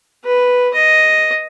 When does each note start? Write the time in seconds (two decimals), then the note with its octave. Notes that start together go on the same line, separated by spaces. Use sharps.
0.24 B4
0.73 D#5